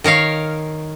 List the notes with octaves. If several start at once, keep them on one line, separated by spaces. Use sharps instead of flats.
D#3 A#4 C#5 F5